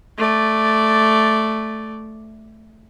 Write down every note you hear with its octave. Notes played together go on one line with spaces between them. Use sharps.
A3 D5